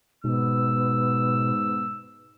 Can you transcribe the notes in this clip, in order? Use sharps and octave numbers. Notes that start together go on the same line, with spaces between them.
G#2 B2 B3 E6